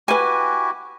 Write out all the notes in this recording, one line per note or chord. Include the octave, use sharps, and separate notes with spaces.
E4 F#4 G4 B4 G#5